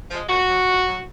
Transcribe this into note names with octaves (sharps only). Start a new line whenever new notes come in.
F3 G#3
A#2 F#4
F#3
A#2
F#3